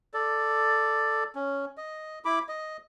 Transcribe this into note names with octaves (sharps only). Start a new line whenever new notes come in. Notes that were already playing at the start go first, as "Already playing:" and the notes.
A4 D5
C#4
D#5
E4 B5 D6
D#5